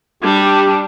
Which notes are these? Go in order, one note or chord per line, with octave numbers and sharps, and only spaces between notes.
G3 D4 G4